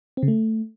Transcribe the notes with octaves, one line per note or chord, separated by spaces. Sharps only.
C4
C#3
A3